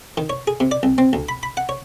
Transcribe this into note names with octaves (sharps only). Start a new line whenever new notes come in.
D#3
C#5
G#4
C3
D5
C2
C4
D2
B5
B5
F#5
C#5